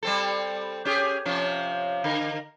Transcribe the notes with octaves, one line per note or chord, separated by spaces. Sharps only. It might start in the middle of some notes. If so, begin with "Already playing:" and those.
G3 C4 A4
C#4 G4 G#4
C3 F3 C#4
D3 A#4